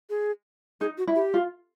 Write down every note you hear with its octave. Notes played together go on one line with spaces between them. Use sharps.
G#4
D#4 G#4
F#4
E4
G4
F4